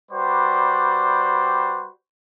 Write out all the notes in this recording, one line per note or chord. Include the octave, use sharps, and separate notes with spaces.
G3 F#4 G4 B4 C5 D5